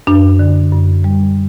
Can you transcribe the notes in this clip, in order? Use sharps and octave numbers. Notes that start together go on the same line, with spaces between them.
F#2 D4
D3
F#2
G3